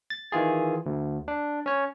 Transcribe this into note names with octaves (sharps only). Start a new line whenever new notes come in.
A6
D#3 E3 F4 G#4
D2
D4
C#4 C#5